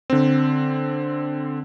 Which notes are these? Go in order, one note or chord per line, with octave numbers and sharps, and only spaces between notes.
D3 C4